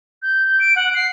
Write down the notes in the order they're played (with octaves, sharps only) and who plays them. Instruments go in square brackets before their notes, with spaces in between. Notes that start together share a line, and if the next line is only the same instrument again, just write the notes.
[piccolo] G6
D7
F#5
C7